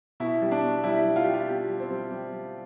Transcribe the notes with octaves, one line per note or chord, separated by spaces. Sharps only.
B2 E4
G3
D4
B2
G3 E4
G3
F4
G3 G4
F4
B2 G4
G3
C4
G3
G3
G3